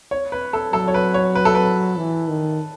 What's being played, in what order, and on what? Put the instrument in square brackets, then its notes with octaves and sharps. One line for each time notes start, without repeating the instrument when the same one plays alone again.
[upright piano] C#5
B4
A4
[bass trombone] F#3 [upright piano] A4
[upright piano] C#5
B4
C#5
B4
A4
B4
[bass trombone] E3
D#3